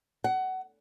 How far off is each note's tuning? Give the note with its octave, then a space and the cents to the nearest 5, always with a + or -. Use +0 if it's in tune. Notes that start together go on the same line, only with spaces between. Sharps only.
F#5 +20